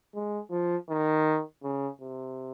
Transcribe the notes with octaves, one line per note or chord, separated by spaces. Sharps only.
G#3
F3
D#3
C#3
C3